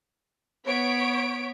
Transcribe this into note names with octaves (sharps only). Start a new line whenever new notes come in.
B3 C#5 B6 D7